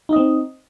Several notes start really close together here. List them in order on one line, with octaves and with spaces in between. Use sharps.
D#4 D#5 C4